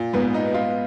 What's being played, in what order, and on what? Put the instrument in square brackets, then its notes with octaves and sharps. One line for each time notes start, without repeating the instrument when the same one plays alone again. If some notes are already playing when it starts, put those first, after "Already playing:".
Already playing: [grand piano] A#2
[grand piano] G#2 [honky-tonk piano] B3
[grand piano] D#4
F4